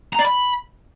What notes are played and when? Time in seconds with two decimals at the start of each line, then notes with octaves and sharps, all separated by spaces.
0.13 A#5
0.19 D5
0.25 B5